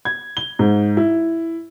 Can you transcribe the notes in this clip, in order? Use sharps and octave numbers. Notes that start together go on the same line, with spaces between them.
G#6
G7
G#2
E4